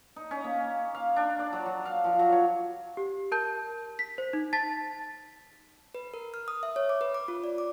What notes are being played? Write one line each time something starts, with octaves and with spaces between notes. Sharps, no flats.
D#4
C#4
A#3
F5
D4
D5
F#3
F#3
F5
F3
F#3
C#5
G4
A#4 A5 G6
B6
C5
D#4
A5 A6 B6
B4
A#4
F6
D#6
E5
C#5
D6
B4
D6
F4
D5
D6